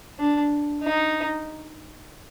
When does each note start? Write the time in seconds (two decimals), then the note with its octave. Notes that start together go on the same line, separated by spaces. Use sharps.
0.19 D4
0.84 D#4